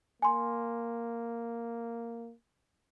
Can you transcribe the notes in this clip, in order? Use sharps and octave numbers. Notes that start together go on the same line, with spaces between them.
A#3 G#5 C6